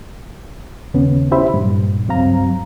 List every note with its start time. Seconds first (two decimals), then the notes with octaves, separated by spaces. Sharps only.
0.94 D#2 C#3 B3 C#4
1.31 C#4 E4 G4 C5 E5 B5
1.54 G2 A#2
2.08 C#2 G2 F#3 C4 F5 A#5